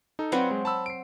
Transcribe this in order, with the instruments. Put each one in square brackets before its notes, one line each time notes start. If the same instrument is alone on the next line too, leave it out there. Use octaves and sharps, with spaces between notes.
[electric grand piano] D#4 A4
[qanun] F#3 C4 F#4 [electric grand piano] F4 B4 D5
[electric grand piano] G#3
A5 B5 E6
C7 D7